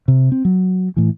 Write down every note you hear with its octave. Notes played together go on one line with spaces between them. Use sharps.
C3
C4
F#3
A2 E3